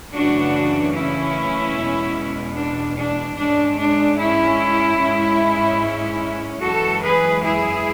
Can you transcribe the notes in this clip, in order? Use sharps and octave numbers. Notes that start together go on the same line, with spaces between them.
F#2 C#3 E3 A3 C#4 D4 F#4
C#4 E4
E2 B2 G#3
D4
D4
G#2 G#3 C#4 D4
D4
C#4 E4
G#2 G#3 C#4
F#2 E3 G#3 F#4 A4
G#4 B4
E4 G#4